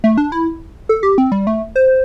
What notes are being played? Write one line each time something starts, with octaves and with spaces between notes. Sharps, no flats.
A3
D4
E4
A4
G4
C4
G3
A3
C5